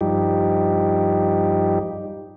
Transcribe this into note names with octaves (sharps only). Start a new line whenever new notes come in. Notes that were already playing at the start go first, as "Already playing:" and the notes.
G2 F3 G3 D#4 G4